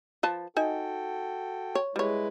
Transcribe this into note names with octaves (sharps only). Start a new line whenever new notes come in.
F3 B4 A5
D#4 F#4 A4 G5 G#5
C#5
G3 G#3 E4 B4 C#5